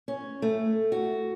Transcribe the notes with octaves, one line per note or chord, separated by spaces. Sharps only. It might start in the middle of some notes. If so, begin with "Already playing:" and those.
C#4
A3
F#4